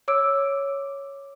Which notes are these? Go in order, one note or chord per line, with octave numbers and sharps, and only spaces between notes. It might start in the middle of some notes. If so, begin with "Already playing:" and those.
C#5 D6 E6 D7